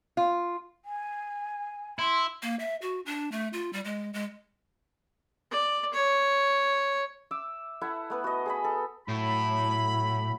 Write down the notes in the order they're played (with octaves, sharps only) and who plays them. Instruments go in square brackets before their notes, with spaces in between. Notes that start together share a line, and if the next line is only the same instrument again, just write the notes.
[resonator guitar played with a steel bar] F4
[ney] G#5
[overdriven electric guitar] E4 [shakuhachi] C6
[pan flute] A#3
E5
F#4
D4
A3
F4
G3
G#3
G#3
[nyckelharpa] D5
C#5
[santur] E5 D6 E6
E4 A4 E5 F#5
A3 B3 B4
F#4 D#5
G#4 D#5 B5
A4
[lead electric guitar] A2 [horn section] F#3 E4 B5